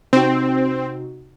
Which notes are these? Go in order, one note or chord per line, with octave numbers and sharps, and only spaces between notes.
C3 C4 D#4 F#4